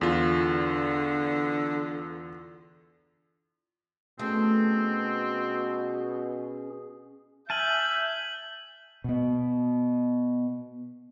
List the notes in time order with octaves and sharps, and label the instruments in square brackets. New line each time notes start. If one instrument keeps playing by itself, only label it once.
[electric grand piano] E2 F4 [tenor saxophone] D3
[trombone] B2 [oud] A3 [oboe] C4 [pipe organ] C#4 G#4
[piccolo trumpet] E5 [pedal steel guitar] G#5 A5 [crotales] F6 F#7 [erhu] G6
[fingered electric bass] B2 B3